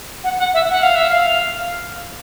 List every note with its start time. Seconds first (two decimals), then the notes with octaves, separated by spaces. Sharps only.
0.24 F#5
0.39 F#5
0.54 E5
0.70 F#5
0.83 F5
0.95 E5
1.08 F5